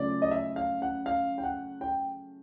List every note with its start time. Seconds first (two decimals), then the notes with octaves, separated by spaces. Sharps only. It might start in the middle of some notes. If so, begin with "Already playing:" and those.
Already playing: C#3 F#3 A3 F4 D5
0.22 D#5
0.31 E5
0.56 F5
0.82 F#5
1.06 F5
1.38 G5
1.44 F#5
1.81 G5